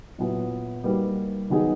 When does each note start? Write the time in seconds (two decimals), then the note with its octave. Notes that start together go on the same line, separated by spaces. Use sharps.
0.18 A#2 F#3 B3 E4
0.84 G3 A#3 D#4 F#4 B4
1.50 D#3 F#3 B3 D#4 G#4